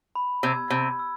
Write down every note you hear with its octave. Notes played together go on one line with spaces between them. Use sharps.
B5
C3 E6 G#6
C3 B5
E6